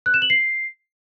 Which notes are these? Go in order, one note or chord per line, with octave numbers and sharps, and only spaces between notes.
F#6
E7
F#7
C7